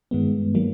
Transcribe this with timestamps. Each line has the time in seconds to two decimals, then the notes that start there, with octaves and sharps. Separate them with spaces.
0.11 G2 D#3 G#3 B3
0.55 D#3 F#3 A#3